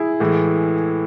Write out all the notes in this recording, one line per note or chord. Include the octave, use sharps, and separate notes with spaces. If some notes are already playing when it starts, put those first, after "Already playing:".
Already playing: E4 G#4
A2 E3 G#3